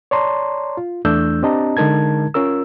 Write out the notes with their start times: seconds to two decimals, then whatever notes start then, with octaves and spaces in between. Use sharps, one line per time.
0.11 C#5 D5 A5 A#5 C6
0.77 F4
1.05 E2 E3 A3 D4 E6 G6
1.43 C4 D4 G4 D#5 A5 A#5
1.77 D3 G#3 D#4 A#4 A5 G#6
2.34 C#4 F4 A#4 E6